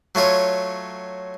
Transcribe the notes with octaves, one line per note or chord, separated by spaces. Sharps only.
F#3 A3 F4 C#5